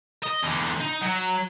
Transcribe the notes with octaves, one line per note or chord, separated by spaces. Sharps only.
D#5
E2 D3
D#4
F#3